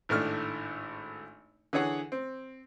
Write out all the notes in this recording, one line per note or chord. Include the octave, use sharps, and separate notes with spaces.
G#1 A2 A3 D4 F6
D3 E3 G#4 C#5 F#5
C4